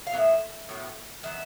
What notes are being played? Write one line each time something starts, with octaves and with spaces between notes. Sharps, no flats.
F5
A2 F#3 B3 E5
A2 F#3 B3
D#3 F#3 B3 E5